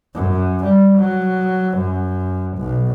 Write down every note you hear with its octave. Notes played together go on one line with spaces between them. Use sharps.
F#2
G3
F#3
F#2
B1